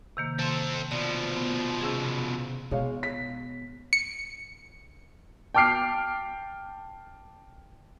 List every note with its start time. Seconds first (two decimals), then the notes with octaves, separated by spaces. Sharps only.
0.17 C3 D#3 A#3
0.39 C4 A4 C6 A6
0.91 B2 F3 D5
1.36 B3
1.81 C3 C#4 G#4
2.71 B2 G#3 C#5 F5
3.03 B6
3.93 C#7
5.54 G5 A5 D6 F6 C7 D7